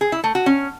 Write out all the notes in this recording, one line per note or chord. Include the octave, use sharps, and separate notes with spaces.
G#4
E4
A3
F#4
C#4